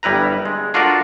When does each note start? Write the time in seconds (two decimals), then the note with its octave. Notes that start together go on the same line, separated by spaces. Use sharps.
0.03 G1 G3 E4 B4 A#5
0.45 G#3
0.74 D4 F4 F#4 A4 A#4 D5